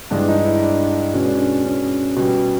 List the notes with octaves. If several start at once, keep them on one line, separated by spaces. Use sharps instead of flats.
G2 E3 G#3 D4
D#4
E4
D4
B2 G#3 C#4
D4
C#4
C#4
B2 G3